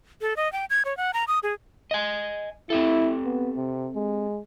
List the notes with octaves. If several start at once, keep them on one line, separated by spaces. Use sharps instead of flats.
A4
D#5
G5
G#6
C#5
F#5
A#5
D#6
G#4
D#5 G#5
C4 E4 G4 A4
B3
C3
G#3